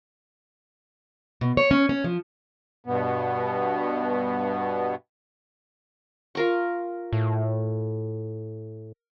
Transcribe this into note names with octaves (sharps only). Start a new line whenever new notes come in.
B2
C#5
C#4
C#4
F3
G2 B2 B3
F4 A#4 C#6
A2